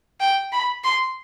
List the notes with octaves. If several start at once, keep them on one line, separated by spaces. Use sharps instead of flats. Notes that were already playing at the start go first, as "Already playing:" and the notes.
G5
B5
C6